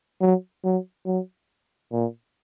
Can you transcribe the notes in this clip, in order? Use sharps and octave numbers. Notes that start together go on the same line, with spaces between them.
F#3
F#3
F#3
A#2